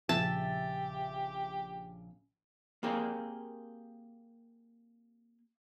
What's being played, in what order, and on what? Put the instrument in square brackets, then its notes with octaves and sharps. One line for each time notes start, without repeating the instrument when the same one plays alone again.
[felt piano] A#1 C#3 [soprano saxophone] G4 [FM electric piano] E5 [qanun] A5
[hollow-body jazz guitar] A#3 C4 G4 G#4 A#4